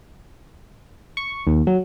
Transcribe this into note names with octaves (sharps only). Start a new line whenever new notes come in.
C#6
D#2
F#3